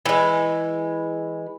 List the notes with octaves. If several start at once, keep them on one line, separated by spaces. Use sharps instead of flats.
E3 G#3